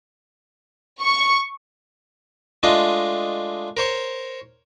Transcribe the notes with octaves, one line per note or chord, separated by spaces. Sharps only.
C#6
G#3 A3 D4 F4 D#5
A#4 C5 C#5